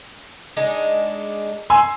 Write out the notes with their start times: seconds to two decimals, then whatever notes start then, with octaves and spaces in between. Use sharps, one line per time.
0.57 G#3 D4 D#4
1.70 G#5 C6 E6